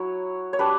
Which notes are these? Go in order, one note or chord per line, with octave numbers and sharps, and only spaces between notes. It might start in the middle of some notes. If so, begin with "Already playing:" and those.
Already playing: F#3 E4 C#5
C#5
G3 D4 B4